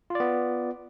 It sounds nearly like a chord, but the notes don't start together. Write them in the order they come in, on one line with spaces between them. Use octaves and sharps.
F4 D5 B3